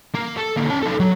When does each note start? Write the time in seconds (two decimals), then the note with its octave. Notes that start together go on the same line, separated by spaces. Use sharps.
0.14 A#3
0.37 A4
0.57 D2 A#3
0.70 C#4 A5
0.82 D#4 A4
1.00 F#3